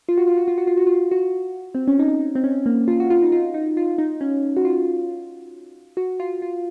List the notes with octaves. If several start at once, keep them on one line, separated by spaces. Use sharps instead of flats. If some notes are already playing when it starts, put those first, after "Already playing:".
F4
F#4
F4
F#4
F4
F#4
F4
F#4
F4
F#4
C4
C#4
D#4
C4
C#4
A#3
F4
F#4
F4
D#4
F4
D#4
F4
D#4
C#4
F#4
F4
F#4
F4
F4